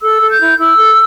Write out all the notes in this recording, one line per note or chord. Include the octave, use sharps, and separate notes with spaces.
A4 E6
A4
G6
E4
E4 E6
A4